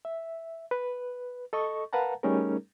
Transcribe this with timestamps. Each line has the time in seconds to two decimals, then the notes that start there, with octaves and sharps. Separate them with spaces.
0.05 E5
0.71 B4
1.53 A4 D#5 C#6
1.93 A#4 B4 F5 F#5 A5 A#5
2.23 G3 A3 C#4 D#4 G#4 A#4